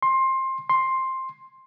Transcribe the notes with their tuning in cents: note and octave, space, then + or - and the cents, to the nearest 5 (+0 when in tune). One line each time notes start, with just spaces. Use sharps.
C6 +20
C6 +10